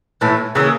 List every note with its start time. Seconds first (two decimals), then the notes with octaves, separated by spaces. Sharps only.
0.21 A2 E3 A3
0.55 C#3 E3 A#3